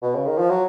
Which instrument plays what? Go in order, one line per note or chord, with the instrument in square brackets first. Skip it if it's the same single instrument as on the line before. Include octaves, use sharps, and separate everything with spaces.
[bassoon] B2
C#3
D#3
F3
F#3